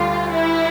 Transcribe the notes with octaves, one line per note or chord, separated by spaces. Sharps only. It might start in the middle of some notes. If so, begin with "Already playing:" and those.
Already playing: D2 D3 G3 F4
E4